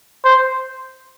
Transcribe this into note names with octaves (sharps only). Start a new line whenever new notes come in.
C5